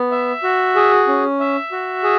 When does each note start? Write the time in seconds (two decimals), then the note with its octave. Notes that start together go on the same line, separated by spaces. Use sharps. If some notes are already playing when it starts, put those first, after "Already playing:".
Already playing: B3
0.11 E5
0.44 F#4
0.76 G#4
1.08 C#4
1.40 E5
1.72 F#4
2.04 G#4